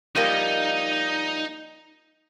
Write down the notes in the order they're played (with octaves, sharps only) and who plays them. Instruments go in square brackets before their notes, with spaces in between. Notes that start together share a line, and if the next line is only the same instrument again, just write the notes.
[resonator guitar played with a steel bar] F3 G3 A#3 [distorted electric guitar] D#4 D#5